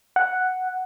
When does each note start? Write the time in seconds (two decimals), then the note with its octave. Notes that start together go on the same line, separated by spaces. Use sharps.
0.16 F#5